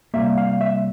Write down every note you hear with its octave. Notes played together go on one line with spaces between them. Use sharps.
C2 C3 G3 A#3 E5
F5
E5